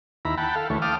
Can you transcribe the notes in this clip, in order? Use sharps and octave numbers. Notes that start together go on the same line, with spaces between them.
D#2 E4 A#5 B5
F#5 G5 A5 B5
A4 F5
D2 E3 A3 C#5
F5 G5 A5 D6 D#6 F6